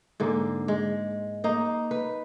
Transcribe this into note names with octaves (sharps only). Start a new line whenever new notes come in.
G#2 D3 A#3
G#3
A#3 D#4
B4